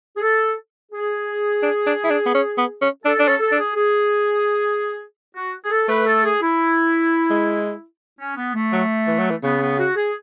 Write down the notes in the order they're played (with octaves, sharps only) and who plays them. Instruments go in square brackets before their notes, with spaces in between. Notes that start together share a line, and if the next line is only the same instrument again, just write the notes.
[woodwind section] G#4
A4
G#4
[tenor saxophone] D4
D4
E4
D4
B3
C#4
B3
C#4
[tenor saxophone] D4 [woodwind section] A4
[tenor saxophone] D4 [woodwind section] A4
[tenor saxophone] C#4
[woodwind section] A4
[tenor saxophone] D4
[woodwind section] G#4
G#4
F#4
G#4
A4
[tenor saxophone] A3 [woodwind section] B4
[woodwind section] A4
G#4
E4
[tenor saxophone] G#3
[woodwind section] C#4
B3
A3
[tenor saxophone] F#3
E3
F#3
E3
[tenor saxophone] C#3 [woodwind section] B3
[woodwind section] B3
F#4
G#4